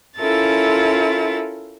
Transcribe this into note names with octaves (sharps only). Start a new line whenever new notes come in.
C#4 E4 F4 A4 A#4 A6